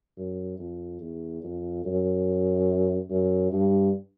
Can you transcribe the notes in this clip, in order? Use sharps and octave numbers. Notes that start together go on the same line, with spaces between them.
F#2
F2
E2
F2
F#2
F#2
G2